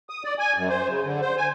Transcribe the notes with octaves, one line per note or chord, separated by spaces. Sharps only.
D#6
D5
G#5
F#2
C5
C#3
D3
C5
G#5